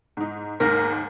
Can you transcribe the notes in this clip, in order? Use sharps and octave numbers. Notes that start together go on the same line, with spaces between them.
G#2 D#4
D#2 G#2 A#4